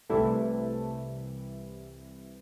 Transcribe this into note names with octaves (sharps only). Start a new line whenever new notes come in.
C2 C3 E3 G3 A3 E4